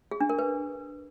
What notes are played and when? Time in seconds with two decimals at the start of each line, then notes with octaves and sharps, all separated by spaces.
0.11 G#4
0.21 D4
0.30 A#4
0.39 B4